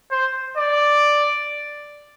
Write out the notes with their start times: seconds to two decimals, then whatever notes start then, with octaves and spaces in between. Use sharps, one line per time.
0.11 C5
0.58 D5